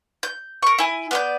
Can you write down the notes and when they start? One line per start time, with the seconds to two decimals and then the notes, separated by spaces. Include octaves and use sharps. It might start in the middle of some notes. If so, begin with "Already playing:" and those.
0.23 G6
0.63 A#4 C#6
0.78 E4 G#5
1.11 B3 D5 G6